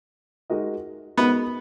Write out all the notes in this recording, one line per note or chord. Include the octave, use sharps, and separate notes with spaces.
G#3 D#4 F#4 A#4 D#5
G#3 B3 D#4 F#4 A#4 D#5